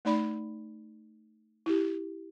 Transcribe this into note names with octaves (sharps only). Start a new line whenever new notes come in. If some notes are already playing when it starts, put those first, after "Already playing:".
A3 D#4 D5 B5
E4 G4